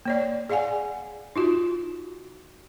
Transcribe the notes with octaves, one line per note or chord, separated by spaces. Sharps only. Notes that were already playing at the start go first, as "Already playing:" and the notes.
A#3 C#5 D5
G#4 D5 F5 F#5 G#5
D#4 F4 F#4